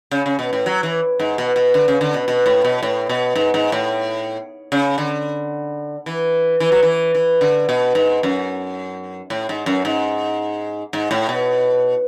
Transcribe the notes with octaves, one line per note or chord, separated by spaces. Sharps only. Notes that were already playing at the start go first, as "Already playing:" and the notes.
C#3
C#3
B2
A2
F#3
E3
G#2
B2
B2
D3
C#3
D3
B2
B2
A2
B2
A2
B2
G#2
G#2
A2
C#3
D3
E3
E3
F#3
E3
E3
D3
B2
G#2
F#2
A2
G#2
F#2
G#2
G#2
A2
B2